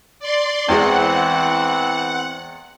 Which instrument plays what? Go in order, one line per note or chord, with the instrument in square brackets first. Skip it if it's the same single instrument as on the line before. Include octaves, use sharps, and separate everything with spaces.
[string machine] D5 C6
[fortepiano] E2 G#3 [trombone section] E3 C4 [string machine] F#5